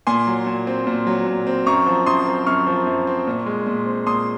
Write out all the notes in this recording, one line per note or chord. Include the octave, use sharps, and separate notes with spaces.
A#2 G#5 C6
F#3
A#2
C4
A#2
F#3
A#2
C4
F#2 A#5 C#6
F3
F#2 C6 D#6
C4
F#2 C#6 F6
F3
F#2
C4
A#2
G#3
A#2
C4
A#2 C6 D#6